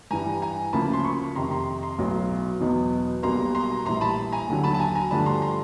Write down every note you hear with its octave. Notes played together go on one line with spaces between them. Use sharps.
G2 E3 G3 G#5 A#5
G#5 A#5
D2 C#3 F3 A#3 A5 B5
C6
B5 C#6
F2 C3 D#3 A#5 C6
A#5 C6
A#5 C6
B1 A2 F#3 B3
E2 B2 F#3 B3 D#4
B1 B2 G3 A#3 A#5 C6
A#5 C6
A#1 A2 E3 G3 A#5 C6
A5 B5
G#5 A#5
D#2 D3 F#3
A5 B5
A5
G#5 A#5
G#5 A#5
G2 D3 F3 A3 D4 A5 B5
A#5 C6
A#5 C6